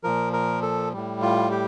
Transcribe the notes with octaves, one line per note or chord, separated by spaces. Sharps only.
A#2 F3 A#4
A#4
A4
A2 G3
F4
G4